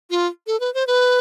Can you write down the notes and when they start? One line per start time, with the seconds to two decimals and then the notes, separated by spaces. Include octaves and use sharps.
0.10 F4
0.47 A4
0.60 B4
0.74 C5
0.87 B4